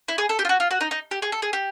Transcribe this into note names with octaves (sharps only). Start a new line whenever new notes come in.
E4
G#4
A4
G4
F4
F#4
F4
F#4
D#4
D#4
G4
G#4
A4
G#4
G4